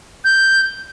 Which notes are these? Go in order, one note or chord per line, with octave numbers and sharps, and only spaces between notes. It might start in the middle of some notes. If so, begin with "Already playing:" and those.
G6